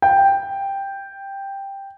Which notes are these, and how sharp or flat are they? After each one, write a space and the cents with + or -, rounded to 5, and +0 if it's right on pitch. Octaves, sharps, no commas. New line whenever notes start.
G5 +5